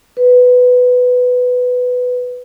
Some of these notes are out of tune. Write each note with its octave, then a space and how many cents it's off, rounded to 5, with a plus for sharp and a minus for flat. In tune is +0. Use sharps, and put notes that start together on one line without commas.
B4 +10